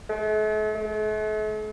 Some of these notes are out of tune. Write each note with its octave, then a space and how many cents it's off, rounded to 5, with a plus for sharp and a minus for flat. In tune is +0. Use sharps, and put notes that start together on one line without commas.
A3 -45
A3 -45